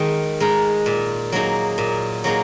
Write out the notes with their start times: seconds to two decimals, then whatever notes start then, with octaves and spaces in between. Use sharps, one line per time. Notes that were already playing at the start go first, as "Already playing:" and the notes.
Already playing: D#3 G#3 D#4
0.40 G#3 D#4 A#4
0.86 A#2
1.32 F#3 A#3 D#4 G#4
1.78 A#2
2.24 F#3 A#3 D#4 G#4